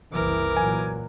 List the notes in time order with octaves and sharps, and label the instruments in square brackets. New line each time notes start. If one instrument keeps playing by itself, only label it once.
[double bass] F#1 C2 [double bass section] E3 [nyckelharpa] A#4 D6
[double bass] A#2 F#3 [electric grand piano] G#5